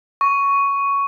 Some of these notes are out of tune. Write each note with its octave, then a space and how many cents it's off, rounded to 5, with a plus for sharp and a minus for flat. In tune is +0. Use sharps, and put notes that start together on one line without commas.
C#6 +10